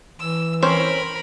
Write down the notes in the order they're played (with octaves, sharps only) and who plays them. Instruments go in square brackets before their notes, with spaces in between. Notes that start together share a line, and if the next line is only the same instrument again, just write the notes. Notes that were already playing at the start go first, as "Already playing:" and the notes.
[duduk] E3 [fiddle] E6
[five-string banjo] C4 C#4 C5 [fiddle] A#4 B5